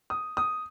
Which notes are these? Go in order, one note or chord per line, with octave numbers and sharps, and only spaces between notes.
D#6
D#6